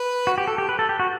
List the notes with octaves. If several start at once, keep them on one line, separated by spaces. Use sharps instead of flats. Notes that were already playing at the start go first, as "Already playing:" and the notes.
Already playing: B4
F#4
G4
A4
G4
B4
A4
G4
F#4